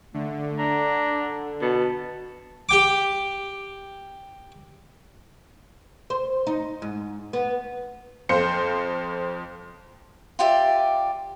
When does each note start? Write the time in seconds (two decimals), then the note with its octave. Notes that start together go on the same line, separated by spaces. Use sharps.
0.14 D3 A3
0.59 D4 A#5
1.62 B2 A5
2.69 G4 G5 D6
6.10 C5
6.47 D#4
6.82 G#2
7.33 B3
8.29 F2 C5 F5 G6 C#7
10.39 F4 G4 D5 E5